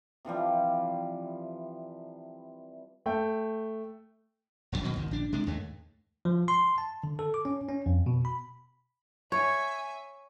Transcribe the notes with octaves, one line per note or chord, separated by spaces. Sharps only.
C3 E3 F3 G3
A3 G5
E1 B1 A#2 D3
B2 D#3 F#3
C2 G#2 D#3
A#1 D4
C3 G#3 D4
D#2 G#2 G#3 A3
F3
C6
A5
D3
A4
D6
C#4
C#4
F2
B2
B5
C#5 E5 G#5